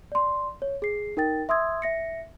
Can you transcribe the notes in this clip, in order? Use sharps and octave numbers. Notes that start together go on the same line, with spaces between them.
D5 C6
C#5
G#4 C7
D#4 A#4 G5 A6
E5 C6 D#6 E6 G#6
E5 A#6 C#7